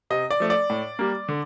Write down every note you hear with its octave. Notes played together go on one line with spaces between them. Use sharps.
C3 D#5
D5
F3 A3
D5
A2
G3 A#3
D3